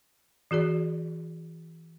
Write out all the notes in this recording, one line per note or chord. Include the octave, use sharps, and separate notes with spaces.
E3 F#4 G#4 D5